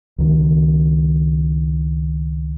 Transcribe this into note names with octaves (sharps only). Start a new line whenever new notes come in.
C#2 D#3